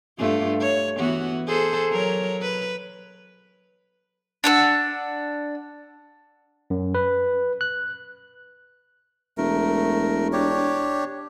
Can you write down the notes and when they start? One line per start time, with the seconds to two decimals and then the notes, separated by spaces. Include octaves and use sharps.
0.18 G2 A3 F4
0.60 C#5
0.96 E3 B3 F#4
1.48 G#4 A4 C5
1.91 F#3 A#4 C#5
2.42 B4
4.44 D4 F#5 E6
6.70 F#2
6.95 B4
7.61 F#6
9.38 E1 A3 A#4
10.33 D4 G4 C#5